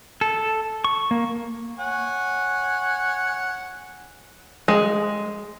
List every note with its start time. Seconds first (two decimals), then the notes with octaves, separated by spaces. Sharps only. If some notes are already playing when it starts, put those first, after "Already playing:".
0.21 A4
0.84 C#6
1.11 A#3
1.79 C#5 F#5 G#5
4.68 G#3